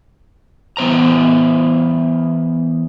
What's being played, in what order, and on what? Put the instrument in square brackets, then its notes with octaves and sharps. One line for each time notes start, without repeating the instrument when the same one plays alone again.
[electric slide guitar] E3 B3 C5 A#5